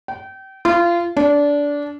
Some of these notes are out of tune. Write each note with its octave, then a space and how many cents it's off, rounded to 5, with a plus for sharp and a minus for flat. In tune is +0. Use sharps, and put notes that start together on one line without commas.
G5 -30
F4 -25
D4 -20